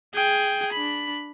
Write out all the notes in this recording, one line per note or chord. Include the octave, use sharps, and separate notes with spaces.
G#4 G5
D4 B5